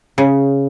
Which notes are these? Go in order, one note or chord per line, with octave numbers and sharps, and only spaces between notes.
C#3